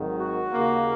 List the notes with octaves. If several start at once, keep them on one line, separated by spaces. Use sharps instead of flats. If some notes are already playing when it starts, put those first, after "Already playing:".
Already playing: G#1 G#2 D#3 F#3
F#4
D#2 C#3 A#3